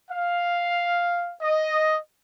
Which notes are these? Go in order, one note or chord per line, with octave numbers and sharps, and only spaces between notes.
F5
D#5